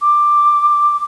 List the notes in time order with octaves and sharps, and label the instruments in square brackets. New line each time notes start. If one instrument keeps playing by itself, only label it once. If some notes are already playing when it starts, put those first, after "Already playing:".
[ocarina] D6